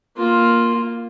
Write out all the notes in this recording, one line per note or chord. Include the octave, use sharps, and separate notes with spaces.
A#3 F4